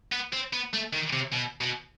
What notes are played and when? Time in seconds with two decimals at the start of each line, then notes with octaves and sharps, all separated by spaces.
0.12 B3
0.33 C4
0.53 B3
0.73 A3
0.93 D#3
1.13 C3
1.33 B2
1.61 B2